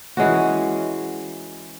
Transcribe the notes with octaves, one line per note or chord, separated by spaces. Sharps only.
E3 G#3 C#4 F#4